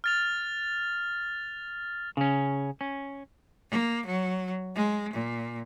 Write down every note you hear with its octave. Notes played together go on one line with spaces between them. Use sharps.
F6 A6 F7
C#3 C#4
C#4
A#3
F#3
G#3
A#2